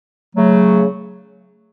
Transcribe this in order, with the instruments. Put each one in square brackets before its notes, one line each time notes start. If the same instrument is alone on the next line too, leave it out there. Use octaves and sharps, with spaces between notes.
[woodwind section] C#3 F#3 A3